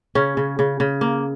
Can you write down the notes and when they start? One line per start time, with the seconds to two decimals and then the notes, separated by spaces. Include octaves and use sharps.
0.15 C#3 C#4
0.37 C#3
0.59 C#3
0.80 C#3
1.01 A#3